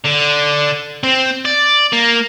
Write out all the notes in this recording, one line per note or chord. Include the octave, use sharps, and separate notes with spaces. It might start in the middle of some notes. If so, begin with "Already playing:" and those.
D3
C4
D5
A#3